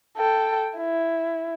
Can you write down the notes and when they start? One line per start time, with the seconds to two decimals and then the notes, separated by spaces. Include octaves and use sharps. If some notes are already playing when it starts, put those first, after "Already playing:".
0.17 A4 G5
0.78 E4